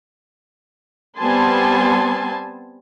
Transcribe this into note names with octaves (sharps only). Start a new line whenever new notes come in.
G3 B3 C4 G#5 A5 C6